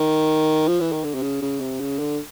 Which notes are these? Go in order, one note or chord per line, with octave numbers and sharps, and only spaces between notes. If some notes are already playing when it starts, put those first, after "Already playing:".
Already playing: D#3
F3
E3
D#3
D3
C3
C#3
C#3
C3
C#3
D3